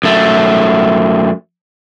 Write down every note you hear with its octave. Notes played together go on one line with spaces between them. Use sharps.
F#2 A3